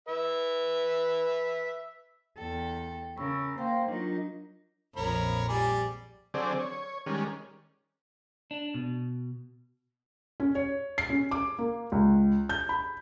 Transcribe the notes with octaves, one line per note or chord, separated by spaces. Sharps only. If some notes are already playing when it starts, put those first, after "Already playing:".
B4 E5
E2 A4 G5
C#3 A#4 B5 C#6 E6
A#3 C5 F5 G5 C6
F#3 D4 D#4 F4 A#4
A#1 F2 A#4 C#5 B5
G3 G#4 D5
D3 F#3 C4 G#4 D5
C#5
D#3 G3 G#3 C#4
D4
B2
C#4
C#5
C7
C#4
D6
A#3
C#2
G6
B5